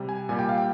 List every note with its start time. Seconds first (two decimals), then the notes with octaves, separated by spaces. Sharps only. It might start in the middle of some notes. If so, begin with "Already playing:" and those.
Already playing: C3 G3
0.09 G#5
0.29 A#2 G3 G#5
0.39 G5
0.49 F5
0.58 G5